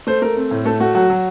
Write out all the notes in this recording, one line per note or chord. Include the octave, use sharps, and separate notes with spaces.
A3 C5
A3 A#4
C4
A2
A3 A4
A3 F#4
F#3 F#4
F#3